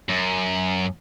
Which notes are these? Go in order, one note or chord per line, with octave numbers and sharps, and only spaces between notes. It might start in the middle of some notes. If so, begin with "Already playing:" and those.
F#2